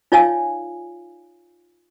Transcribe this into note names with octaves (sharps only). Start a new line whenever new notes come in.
D#4 F4 C#5 D5 F5 G#5